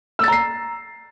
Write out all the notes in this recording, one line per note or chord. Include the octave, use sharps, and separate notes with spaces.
A#5 E6 A6 C7